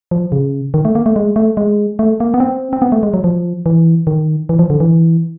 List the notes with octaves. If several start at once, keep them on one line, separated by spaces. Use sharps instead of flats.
F3
C#3
D#3
A3
A#3
A3
G#3
A3
G#3
A3
A#3
B3
C4
C4
B3
A3
G#3
F#3
F3
E3
D#3
E3
F3
D3
E3